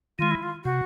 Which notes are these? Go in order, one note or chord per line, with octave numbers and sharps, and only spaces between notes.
D#3 G#3 F4
E4
F4
C3 F#4